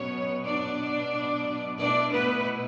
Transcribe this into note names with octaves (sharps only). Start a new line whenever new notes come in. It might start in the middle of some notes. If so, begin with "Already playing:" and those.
Already playing: B2 F#3 B3 C#4 C#5
D4 D5
B2 A3 D4 E4 D5
B3 B4